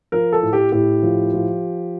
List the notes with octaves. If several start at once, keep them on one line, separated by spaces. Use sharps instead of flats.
F3 A#4
A4
A2
G4
A2 G4
F3
F3